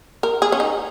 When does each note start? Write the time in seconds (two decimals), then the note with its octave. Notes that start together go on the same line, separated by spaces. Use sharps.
0.23 A#4
0.42 G#4
0.52 C#4
0.60 D#4